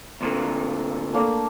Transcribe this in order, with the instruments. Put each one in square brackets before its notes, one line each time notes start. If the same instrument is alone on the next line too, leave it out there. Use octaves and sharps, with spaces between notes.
[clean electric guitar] D2 A#2 D3
[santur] A3 A#3 D4